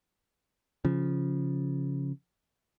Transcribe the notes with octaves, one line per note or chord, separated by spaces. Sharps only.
C#3 F3